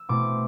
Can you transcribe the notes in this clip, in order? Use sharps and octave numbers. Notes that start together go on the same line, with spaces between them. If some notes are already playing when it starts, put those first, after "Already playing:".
Already playing: E6
B2 A3 C4 E4 D6